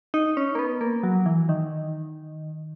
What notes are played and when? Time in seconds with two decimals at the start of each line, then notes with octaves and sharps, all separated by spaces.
0.14 D#4
0.37 C#4
0.55 A#3
0.59 B3
0.81 A#3
1.03 F#3
1.26 E3
1.49 D#3